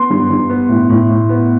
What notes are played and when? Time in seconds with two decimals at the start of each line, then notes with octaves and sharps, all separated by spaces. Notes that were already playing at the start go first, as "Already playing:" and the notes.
Already playing: B3 C6
0.10 G2
0.30 G2
0.50 B3
0.69 A2
0.89 A2
1.09 A2
1.29 B3